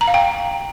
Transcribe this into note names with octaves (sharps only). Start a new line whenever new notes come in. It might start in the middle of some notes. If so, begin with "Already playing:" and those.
A#5
F5
G5